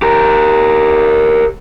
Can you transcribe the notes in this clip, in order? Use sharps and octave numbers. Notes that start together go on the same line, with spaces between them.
G4 A#4